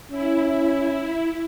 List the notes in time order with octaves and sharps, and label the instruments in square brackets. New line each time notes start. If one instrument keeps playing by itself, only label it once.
[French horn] C#4 [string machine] E4